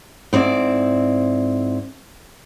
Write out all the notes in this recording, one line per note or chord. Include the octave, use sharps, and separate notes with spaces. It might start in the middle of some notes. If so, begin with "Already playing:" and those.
G#2 C4 E4 D5